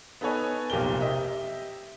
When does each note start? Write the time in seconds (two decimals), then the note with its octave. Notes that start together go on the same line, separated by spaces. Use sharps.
0.21 B3 D#4 A4 B4 C#5 G#5
0.70 F1 B1 A#2 G4 A#4 G7
1.01 G4 D#5 E5